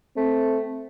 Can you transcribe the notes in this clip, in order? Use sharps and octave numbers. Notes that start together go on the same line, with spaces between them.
A3 C4